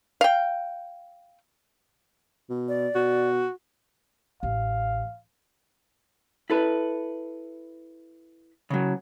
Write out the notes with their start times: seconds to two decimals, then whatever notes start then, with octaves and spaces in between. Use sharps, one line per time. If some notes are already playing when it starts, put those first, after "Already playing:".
0.21 F5 G5
2.50 B2
2.68 D5
2.95 B2 F#4
4.43 A1 F5
6.50 E4 A4 B4
8.70 C#3 F#3